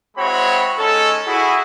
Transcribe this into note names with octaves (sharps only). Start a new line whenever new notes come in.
G#3 C4 E4 F#4 C#5 B5
G#3 C#4 D#4 A4
E4 F#4 G#4